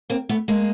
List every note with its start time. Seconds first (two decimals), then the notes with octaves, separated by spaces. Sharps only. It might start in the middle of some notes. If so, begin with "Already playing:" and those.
0.10 A#3 C4
0.29 A3 B3
0.48 G#3 A#3